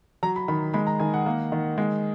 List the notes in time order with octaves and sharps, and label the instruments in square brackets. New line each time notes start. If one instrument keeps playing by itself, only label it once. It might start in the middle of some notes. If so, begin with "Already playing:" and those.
[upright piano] F#3 A#5
B5
D#3 B5
G#3 B5
A#5
D#3 G#5
F#5
A#3
D#3
G#3